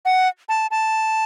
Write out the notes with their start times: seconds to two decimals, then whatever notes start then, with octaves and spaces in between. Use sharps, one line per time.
0.05 F#5
0.49 A5
0.71 A5